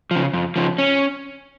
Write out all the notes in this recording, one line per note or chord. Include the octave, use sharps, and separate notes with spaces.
C#3 F3
F2
C#3 F3
C#4